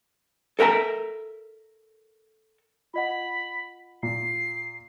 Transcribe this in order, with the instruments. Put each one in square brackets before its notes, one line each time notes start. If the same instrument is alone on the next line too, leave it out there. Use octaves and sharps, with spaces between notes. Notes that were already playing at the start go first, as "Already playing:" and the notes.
[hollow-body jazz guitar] A4 A#4 E5 G5 A#5
[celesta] F4 D#5 F#5 [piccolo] B5
[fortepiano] A#2 [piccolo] C7